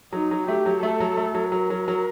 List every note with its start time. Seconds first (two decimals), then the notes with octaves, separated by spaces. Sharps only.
0.13 F#3 D#4
0.31 F#3
0.48 A3 G4
0.66 F#3
0.83 A3 A4
1.00 F#3
1.17 A3
1.34 F#3
1.52 F#3 A#4
1.70 F#3
1.88 F#3